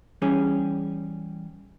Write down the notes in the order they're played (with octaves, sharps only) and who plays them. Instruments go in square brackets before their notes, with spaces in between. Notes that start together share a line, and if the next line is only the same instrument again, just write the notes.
[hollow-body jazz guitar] E3 G3 C#4 G4 G#4